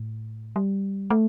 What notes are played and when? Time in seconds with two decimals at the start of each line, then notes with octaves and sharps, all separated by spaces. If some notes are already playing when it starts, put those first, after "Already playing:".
Already playing: A2
0.56 G3
1.10 A3